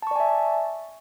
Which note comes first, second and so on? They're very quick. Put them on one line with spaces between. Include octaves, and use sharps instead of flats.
A5 C#6 D5 G#5 E5